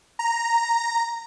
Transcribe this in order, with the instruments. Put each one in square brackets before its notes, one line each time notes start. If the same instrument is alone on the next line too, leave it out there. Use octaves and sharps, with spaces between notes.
[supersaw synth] A#5